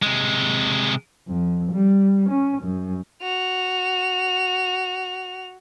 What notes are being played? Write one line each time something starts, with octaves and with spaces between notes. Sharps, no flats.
C3 G#3
F2
G3
C#4
F#2
F#4 F7